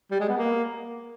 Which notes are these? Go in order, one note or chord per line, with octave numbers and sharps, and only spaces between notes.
G3
G#3
B3
A#3